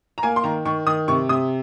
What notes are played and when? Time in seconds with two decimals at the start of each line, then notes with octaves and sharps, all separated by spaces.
0.18 A#5
0.23 A#3 G#5
0.36 C6
0.44 D#3 A#5
0.65 D#3 C#6
0.87 D#3 D#6
1.08 C3 C#6
1.29 C3 D#6